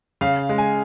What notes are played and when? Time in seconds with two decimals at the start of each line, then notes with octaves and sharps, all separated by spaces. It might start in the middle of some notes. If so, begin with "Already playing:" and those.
0.21 C#3 F5
0.49 G#3
0.58 G#5